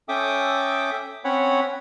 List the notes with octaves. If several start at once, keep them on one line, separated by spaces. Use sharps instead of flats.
C#4 A4 E5 G5 D6 D#6
C4 C#4 C#5 F#5 B5